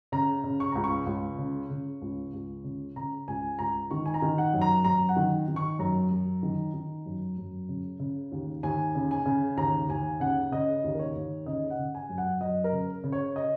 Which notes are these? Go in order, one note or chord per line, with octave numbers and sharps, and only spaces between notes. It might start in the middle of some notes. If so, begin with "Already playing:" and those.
C#3 A#5
C#3
C#6
C#2 A#5
C#6
C#2
C#3
C#3
C#2
C#2
C#3
C#3 A#5
C#2 G#5
C#2 A#5
D#3 C#6
G#5
A#5
D#3
F#5
F#2
A#5
F#2 A#5
F#5
D#3
D#3
C#6
F#2 A#5
F#2
D#3
D#3
F#2
F#2
C#3
C#3
D#2
D#2 G#5
C#3
G#5
C#3
D#2 A#5
D#2 G#5
C#3 F#5
C#3 D#5
D#2
A#4
C#5
D#2
C#3 D#5
F#5
C#3
G#5
F#2
F#5
F#2 D#5
A#4
C#3
C#3
C#5
D#5